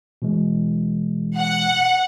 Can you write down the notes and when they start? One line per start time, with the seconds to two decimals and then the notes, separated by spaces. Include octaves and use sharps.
0.22 B2 E3 G#3
1.38 F#5